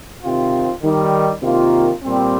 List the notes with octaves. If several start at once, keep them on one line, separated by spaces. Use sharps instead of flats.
C3 D#3 C4 F4
D#3 G3 D#4
C3 D#3 A#3 F4
A#2 G3 C4